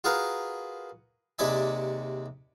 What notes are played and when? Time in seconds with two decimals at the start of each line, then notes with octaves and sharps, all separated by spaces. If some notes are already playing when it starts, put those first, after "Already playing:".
0.04 F4 F#4 G#4 A#4 B4 F5
1.39 D#2 C3 G#3 D5 E5 G#5